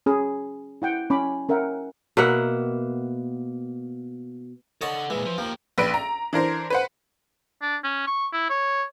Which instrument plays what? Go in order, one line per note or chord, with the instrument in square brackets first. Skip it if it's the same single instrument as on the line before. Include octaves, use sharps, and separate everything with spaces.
[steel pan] C#4 G#4 B5
E4 F#5 G5
C#4 B5 D6
C#4 A#4 E5 F#5 G5
[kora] B2 A#3 E5 F#5
[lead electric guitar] A4 F#5 [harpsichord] C#5 D#5 A5
[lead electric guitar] A#2 G#3 [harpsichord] E3
[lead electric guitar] F3
[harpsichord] F3 [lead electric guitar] A#3 G4
[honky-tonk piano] A#1 B4 D7
A#5
E3 D4 A#4 C5
B4 C5 F#5
[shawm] D4
C#4
C#6
E4
C#5